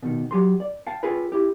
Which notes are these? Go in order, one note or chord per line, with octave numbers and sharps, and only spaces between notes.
B2 D#3
F#3 G4 C6
D5
F5 G5 A5
F4 G#4 B4 G5
E4 G4